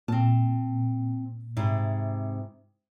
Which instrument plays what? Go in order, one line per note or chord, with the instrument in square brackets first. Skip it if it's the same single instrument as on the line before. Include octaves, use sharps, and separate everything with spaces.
[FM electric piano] A#2 [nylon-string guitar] C4 A5
[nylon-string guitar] G#2 C3 E4